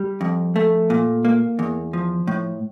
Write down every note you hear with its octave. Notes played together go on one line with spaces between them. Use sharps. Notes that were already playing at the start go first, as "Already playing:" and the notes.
Already playing: G3
F2
A3
A#2
A#3
E2
F3
A2